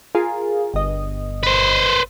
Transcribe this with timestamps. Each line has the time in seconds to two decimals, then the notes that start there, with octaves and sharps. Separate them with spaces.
0.15 F4 G#4 A#4
0.74 G1 D#5
1.43 B4 C5